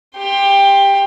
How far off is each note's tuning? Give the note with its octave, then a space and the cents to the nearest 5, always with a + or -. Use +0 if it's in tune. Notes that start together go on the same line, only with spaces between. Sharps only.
G4 +15 C6 +10